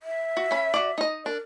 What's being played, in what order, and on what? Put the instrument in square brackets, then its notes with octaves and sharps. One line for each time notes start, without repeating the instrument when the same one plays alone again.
[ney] E5
[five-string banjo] F#4
C#4 B5
F#4 D5
D#4 D#5
[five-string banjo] D4 [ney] A#4